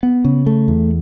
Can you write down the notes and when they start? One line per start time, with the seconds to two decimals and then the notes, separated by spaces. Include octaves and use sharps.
0.03 B3
0.25 C#3
0.46 A3
0.68 E2